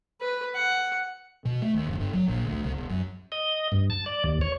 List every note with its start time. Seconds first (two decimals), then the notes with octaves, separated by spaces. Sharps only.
0.21 B4
0.55 F#5
1.45 B2
1.62 A3
1.74 D#2
1.87 F#1
1.99 G1
2.13 F#3
2.28 A#1
2.46 D2
2.63 C2
2.76 E1
2.89 F#2
3.32 D#5
3.72 G2
3.90 A5
4.06 D5
4.24 D#2
4.41 C#5